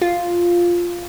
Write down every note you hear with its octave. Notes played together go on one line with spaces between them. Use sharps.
F4